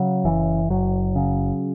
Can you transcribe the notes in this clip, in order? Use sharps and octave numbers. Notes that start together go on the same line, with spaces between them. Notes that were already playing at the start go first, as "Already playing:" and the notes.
Already playing: C#3 F#3
F#1 E3
F#1 F#3
C#3